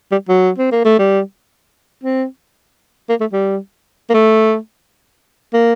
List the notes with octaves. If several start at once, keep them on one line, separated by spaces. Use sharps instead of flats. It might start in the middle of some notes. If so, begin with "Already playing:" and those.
G3
F#3
C4
A#3
A3
G3
C4
A#3
A3
G3
A#3
A3
A#3